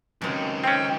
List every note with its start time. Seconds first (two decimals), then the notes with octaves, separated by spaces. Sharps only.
0.22 C#2 F#2 C3 D#3
0.63 C4 C#4 G5